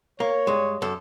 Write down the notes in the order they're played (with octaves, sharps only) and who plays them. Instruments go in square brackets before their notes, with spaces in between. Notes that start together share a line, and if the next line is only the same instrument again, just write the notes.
[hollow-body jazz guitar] A#3 [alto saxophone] C#5
[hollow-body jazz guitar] G2 G#3
F#2 A4